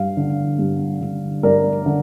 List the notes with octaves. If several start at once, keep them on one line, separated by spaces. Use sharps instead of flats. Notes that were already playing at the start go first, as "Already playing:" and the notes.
Already playing: G2 F5
D3
G2
D3
G2 A#4 D5
D3